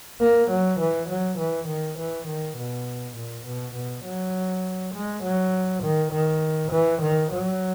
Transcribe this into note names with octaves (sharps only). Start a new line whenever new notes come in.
A#3
F#3
E3
F#3
E3
D#3
E3
D#3
B2
A#2
B2
B2
F#3
G#3
F#3
D#3
D#3
E3
D#3
F#3